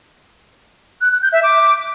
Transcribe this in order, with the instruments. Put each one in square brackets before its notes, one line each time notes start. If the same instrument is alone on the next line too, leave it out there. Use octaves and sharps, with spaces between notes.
[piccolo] F#6
F#6
G6
E5
D6